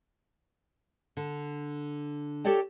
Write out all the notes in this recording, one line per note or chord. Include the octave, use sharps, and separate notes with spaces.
D3
G4 A4 C#5 D5 G5 A5